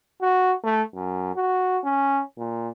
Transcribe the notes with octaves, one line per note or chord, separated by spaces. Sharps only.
F#4
A3
F#2
F#4
C#4
A#2